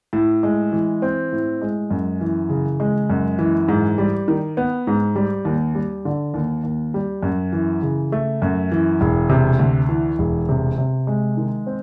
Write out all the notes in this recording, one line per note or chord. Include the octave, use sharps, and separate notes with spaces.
A2
G#3
E3
C4
A2
G#3
F#2
E3
C#3
G#3
F#2
E3
G#2
G3
D#3
B3
G#2
G3
D#2
G3
D3
D#2
D#2
G3
F#2
E3
C#3
A3
F#2
E3
E1
C3
D2
E3
E1
C3
C3
G#3
D#3
C4